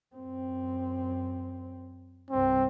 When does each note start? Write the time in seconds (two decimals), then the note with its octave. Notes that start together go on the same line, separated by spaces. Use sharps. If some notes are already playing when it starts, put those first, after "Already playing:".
0.15 F#2 C4
2.31 C2 G2 C4